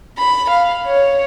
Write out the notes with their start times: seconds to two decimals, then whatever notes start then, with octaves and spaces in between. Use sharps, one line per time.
0.18 B5
0.50 F5
0.87 C#5